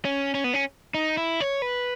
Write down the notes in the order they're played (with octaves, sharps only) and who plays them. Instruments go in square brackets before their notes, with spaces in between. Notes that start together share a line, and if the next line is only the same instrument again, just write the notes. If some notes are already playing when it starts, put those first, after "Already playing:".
[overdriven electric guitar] C#4
C#4
B3
C#4
D#4
E4
C#5
B4